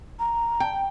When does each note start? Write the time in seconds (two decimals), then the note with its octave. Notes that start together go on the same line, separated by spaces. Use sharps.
0.19 A#5
0.60 G5